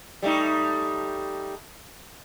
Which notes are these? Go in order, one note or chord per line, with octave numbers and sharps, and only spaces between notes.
G3 A3 D#4